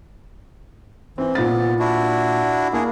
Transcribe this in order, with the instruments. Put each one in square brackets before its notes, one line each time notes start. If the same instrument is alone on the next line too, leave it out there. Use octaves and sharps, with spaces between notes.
[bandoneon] E3 [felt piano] C4
[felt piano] A#2 A6 [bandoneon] B3
[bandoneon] D4 E4 F#4
[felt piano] A#3 [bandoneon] D4 E4 G#4